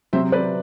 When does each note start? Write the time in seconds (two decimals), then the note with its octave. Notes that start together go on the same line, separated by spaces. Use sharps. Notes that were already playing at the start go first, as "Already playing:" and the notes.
0.13 C3 F#3 C4 C5 E5
0.32 B4 D5